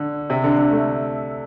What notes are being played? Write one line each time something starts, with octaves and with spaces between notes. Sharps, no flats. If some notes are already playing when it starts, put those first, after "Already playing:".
Already playing: D3
C3
D3
D3
A3